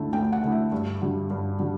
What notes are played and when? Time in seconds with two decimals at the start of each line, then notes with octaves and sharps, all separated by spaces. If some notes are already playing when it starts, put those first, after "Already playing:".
Already playing: D2 D3 A3 E4
0.13 D2 G5
0.32 F#5
0.43 D3 A3 E4
0.52 E5
0.72 G2
1.01 D3 G3
1.30 G2
1.60 D3 G3